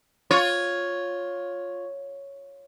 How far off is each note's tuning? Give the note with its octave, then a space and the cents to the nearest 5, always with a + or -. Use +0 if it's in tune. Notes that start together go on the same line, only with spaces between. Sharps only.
F4 +15 C#5 +0